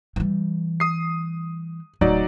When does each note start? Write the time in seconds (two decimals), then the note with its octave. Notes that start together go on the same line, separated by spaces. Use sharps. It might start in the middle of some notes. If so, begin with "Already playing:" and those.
0.16 E3 G3
0.80 D#6 C7
2.01 D1 D2 F#3 D#4 D5